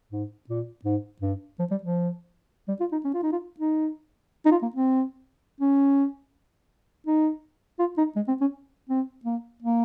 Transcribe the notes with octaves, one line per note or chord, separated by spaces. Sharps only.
G#2
A#2
G#2
G2
F3
G3
F3
G3
F4
D#4
C#4
F4
D#4
F4
D#4
D#4
F4
A#3
C4
C#4
D#4
F4
D#4
G#3
C4
C#4
C4
A#3
A#3